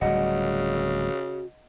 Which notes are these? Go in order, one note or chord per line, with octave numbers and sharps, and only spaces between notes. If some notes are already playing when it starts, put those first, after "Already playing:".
D1 C#3 G3 F#4 D#5 F#5